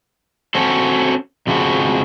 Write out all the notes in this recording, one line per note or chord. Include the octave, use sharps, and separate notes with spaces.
C4 C#4 F#4 A4
F2 C#3 F3 F#4